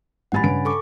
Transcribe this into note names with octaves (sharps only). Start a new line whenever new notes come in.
A1 G3 F#5 G#5 B5 A6
G2 C#3 D7
A4 C#6 D6